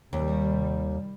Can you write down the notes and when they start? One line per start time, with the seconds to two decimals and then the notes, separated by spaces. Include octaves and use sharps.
0.13 D#2 C3 D#3 G3